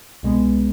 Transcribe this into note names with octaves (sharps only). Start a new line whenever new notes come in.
C2 B2 G#3 B3